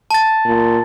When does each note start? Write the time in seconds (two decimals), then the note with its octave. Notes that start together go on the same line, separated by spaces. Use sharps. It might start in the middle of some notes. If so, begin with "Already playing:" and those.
0.11 A5 A6
0.46 A#2